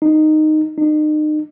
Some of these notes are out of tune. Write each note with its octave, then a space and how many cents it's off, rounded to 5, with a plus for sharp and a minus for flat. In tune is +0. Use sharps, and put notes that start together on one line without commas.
D#4 -10
D#4 -35